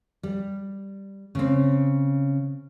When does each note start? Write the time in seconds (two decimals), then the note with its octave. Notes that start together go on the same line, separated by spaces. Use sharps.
0.23 G3
1.35 C#3 C4